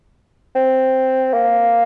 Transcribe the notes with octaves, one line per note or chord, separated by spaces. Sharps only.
C4
A#3